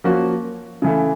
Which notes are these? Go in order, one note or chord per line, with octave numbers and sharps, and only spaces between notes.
F3 A#3 C#4 F#4
C#3 E3 A3